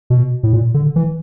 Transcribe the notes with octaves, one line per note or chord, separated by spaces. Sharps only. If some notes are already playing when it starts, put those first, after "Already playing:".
B2
A2
A#2
D3
E3